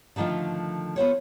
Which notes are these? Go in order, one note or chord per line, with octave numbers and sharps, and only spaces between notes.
D3 D#3 F3 A3 F4
B3 F4 C5 C#5